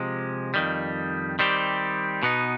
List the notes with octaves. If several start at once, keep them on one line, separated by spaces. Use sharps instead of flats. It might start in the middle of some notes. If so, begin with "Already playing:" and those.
Already playing: C3 F3 G#3
F2 D#3 G3
D#3 G3 C4 G4
B2 B3 D#4